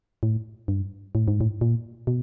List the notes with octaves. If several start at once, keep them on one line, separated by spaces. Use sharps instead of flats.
A2
G2
A2
G#2
A2
A#2
B2